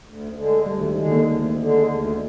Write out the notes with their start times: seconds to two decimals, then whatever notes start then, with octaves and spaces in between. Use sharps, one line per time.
0.04 D2
0.35 D3 G#3
0.65 D2 G3
0.81 D#3
0.96 D#3 G#3
1.00 D3
1.11 A#3
1.27 D2
1.58 D3 G#3
1.88 D2